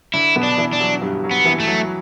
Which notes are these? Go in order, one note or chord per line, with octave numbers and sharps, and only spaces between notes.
D3 D4 E4
B2 B3
D4
E3
D4
F#3
G2 G3
F#3
B3
E3
A3
F#3